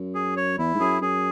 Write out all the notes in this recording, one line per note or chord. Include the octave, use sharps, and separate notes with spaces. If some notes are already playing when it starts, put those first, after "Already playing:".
Already playing: F#2
G#4
C#5
E2 E4
G#2
F#2 G#4
F#2 G#4